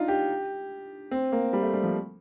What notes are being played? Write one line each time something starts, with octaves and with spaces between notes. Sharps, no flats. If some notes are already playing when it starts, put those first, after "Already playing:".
Already playing: D4 D#4 F4
G4
C4
A#3
G3
A3
G3
F3